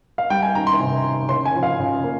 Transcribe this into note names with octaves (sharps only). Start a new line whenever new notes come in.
F5
G3 G5
G#5
D#3 A#5
C6
C3
D#3
C#3 C6
G#5
F3
F5
C#3
A#3